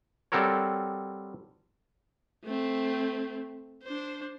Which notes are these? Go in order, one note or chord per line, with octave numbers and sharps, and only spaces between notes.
G3 C4 F#4 A4 A#4 C#5
A3 C4
D4 C5